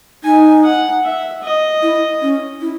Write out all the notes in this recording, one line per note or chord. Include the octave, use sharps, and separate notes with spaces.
D#4 G#5
F#5
E5
D#5
E4
C#4
E4